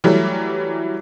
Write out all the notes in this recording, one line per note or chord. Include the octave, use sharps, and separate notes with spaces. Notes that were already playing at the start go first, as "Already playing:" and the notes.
E3 F#3 G3 A3